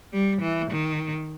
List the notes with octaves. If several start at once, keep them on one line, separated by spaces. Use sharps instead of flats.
G3
E3
D#3